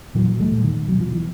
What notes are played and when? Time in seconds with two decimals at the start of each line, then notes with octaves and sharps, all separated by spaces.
0.15 A#2 E3 F#3
0.40 G3 A3
0.52 A#2
0.64 D#3
0.88 B2 F#3
1.00 F3
1.13 E3